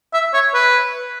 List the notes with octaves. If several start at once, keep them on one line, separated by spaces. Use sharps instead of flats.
E5
C#5
B4